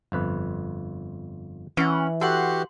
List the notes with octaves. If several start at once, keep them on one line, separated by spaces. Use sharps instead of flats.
G1 F2 B4
E3 C#4 F#5
F#4 G4 A4 F#5 C6